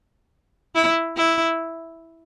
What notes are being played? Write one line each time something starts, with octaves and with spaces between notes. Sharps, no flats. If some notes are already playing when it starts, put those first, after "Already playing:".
E4
E4